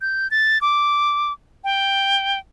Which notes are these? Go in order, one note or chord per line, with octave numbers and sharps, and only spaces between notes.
G6
A6
D6
G5